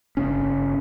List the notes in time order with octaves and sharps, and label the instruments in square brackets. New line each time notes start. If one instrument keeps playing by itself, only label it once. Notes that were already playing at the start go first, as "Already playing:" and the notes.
[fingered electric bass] G1 C#3 C#4